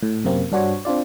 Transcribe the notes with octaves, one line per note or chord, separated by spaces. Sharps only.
A2
F#2 C3 A#3 C4
G2 D4 F#4 C5 C#5
C4 D4 F4 D5